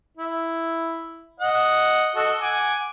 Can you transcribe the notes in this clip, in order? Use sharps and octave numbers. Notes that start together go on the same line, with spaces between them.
E4
D#5 F#5
F#4 A4 D#5
F#5 G#5 D6